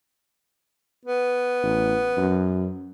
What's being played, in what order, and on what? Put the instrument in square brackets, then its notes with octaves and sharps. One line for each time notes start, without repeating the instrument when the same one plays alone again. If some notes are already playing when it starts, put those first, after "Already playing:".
[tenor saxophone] B3
[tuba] A1
F#2